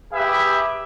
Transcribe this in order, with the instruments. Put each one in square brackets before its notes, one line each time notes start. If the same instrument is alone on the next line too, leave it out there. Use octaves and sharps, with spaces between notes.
[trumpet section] G4 G#4 B4 E5